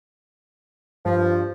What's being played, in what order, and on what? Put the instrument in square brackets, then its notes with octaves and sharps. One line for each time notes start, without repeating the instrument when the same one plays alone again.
[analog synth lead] G2 [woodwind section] F3